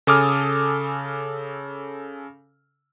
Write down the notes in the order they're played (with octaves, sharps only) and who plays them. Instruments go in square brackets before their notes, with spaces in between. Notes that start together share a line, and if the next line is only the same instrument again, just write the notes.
[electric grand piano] C#3 A4 G#5 D6 D#6 F6